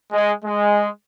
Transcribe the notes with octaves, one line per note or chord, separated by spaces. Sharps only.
G#3
G#3